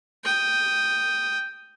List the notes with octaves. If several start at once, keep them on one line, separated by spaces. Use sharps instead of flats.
G5 D#6